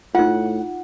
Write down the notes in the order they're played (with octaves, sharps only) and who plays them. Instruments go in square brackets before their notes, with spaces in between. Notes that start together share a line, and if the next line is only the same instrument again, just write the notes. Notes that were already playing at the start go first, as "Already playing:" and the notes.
[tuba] A2 [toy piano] D#4 F4 [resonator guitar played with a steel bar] F#5